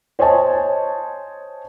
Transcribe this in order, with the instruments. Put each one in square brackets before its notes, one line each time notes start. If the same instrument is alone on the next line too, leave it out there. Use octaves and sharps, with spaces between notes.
[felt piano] C5 C#5 D#5 G#5 A5